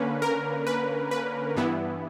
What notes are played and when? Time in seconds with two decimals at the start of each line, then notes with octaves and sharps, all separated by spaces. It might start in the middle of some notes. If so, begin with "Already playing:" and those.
Already playing: D3 A#3 C#4 B4
0.22 A#4
0.67 B4
1.11 B4
1.56 G2 E3 B3 E4